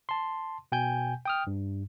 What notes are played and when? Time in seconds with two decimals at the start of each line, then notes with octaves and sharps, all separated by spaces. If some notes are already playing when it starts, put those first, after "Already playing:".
0.09 A5 C6
0.72 B2 G5 G#5 G6
1.26 G5 D#6 F6
1.47 G2